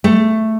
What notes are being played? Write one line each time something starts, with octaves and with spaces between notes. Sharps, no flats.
A3